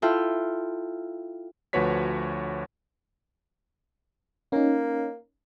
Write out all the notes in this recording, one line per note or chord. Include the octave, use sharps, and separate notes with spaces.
E4 F4 A4 G5
D2 F3 F#4 B4 C#5 B6
A#3 C#4 D#4